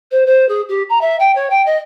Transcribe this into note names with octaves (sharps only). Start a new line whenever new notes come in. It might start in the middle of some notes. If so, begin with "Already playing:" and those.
C5
C5
G#4
G4
A#5
E5
G5
C#5
G5
D#5